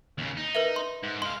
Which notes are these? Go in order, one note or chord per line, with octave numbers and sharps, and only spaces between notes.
D#2 C#3
D#4
A#4 B4 E5
C6
G#2
G#3 F5 C6